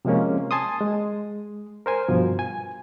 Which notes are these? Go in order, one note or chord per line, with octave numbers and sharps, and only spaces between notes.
C3 F3 G#3 A#3 C#4
G#5 A5 C6 D#6
G#3
A#4 C5 G#5
G2 B2 F3
G#5